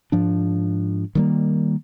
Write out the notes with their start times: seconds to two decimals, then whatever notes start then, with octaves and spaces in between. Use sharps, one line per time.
0.12 G#2 F3 D4
1.15 D#3 G3 A#3